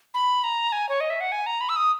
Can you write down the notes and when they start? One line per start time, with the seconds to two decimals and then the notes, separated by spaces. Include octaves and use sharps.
0.14 B5
0.44 A#5
0.72 G#5
0.89 C#5
1.00 D#5
1.10 E5
1.20 F#5
1.32 G#5
1.46 A#5
1.61 B5
1.69 E6
1.76 D#6